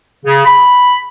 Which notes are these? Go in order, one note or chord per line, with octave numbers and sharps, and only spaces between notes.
C#3
B5